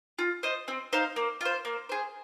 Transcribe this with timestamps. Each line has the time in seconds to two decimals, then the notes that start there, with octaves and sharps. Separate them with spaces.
0.19 F4
0.43 C5 D#5
0.68 C4
0.93 D#4 C5 F5
1.16 A#3
1.41 F4 C5
1.65 A#3
1.89 G#4 C5